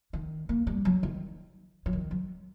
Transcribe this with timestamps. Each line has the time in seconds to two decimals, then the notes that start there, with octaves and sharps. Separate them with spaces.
0.13 D#3
0.49 A#3
0.67 G3
0.85 F#3
1.03 D#3
1.86 F#3
1.93 D#3
2.11 F#3